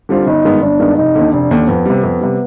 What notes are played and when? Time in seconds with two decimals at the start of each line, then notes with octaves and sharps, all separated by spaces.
0.09 D3 G3 C4 F4
0.27 G1 D#4
0.44 G2 D#3 G#3 B3
0.62 G1 D4
0.80 G2 D#3 G#3 B3
0.97 F1 D#4
1.15 D#2 D3
1.33 F1 D4
1.51 D#2 D3
1.68 F2 B3
1.85 C3 G3
2.03 F2
2.21 C3 G3